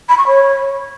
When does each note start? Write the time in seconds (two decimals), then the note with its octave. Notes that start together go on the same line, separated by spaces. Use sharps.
0.09 B5
0.18 C#6
0.27 C#5